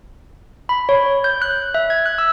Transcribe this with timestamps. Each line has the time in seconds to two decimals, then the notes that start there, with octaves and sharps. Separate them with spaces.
0.69 B5
0.89 C#5
1.24 G6
1.42 F#6
1.74 E5
1.90 G#6
2.06 F#6
2.18 E6